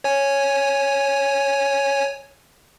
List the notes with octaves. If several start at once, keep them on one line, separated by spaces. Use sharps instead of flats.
C#5 G#5